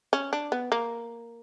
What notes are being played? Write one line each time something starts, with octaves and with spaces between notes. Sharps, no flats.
C#4
D4
B3
A#3